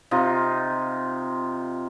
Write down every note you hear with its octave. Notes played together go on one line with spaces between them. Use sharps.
C3 D#4 F4